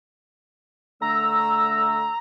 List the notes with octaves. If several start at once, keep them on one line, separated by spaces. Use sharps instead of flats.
D3 A3 A#5 E6